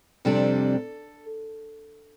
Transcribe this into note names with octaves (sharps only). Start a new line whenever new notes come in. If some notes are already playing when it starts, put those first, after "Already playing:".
F2 C3 G3 D4 A4